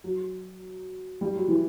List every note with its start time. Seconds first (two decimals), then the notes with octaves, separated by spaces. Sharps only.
0.04 F#3
1.21 G3
1.35 F#3
1.48 E3